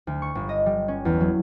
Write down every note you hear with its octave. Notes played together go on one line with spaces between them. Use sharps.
D2
C#6
G1
D#5
G3
C#4
E2
F#3